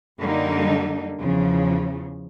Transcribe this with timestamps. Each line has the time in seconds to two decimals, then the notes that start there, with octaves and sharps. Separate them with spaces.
0.20 F#2 D3 G3 A#3 D#4
1.20 E2 C#3 F3